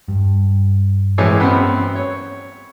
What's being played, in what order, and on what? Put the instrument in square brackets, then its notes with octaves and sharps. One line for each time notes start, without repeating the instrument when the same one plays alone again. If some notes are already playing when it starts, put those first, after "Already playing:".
[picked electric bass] G2
[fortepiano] A2 E3 G#3
F#2 B3 C4
C#5